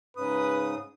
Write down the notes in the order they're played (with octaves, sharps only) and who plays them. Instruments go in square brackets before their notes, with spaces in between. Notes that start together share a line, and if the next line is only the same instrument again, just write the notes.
[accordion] G#2 C#3 D#6 [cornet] B4